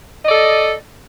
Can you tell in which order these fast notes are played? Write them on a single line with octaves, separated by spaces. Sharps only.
D#5 D5 A4